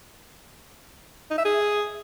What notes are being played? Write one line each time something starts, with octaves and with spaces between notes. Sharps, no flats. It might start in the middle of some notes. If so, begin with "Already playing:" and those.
D#4
E5
G#4